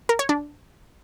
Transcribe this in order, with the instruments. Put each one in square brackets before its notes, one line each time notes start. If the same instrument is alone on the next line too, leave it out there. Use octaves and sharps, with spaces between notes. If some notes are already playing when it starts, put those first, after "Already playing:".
[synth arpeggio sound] A#4
C#5
D4